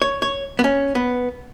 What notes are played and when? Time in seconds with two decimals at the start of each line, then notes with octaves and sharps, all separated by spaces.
0.02 C#5
0.22 C#5
0.59 B3
0.64 C#4
0.95 B3